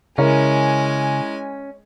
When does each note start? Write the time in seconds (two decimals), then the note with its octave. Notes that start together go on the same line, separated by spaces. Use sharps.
0.18 C#3 G#3 C#4 E4 A#4 C#5 G#5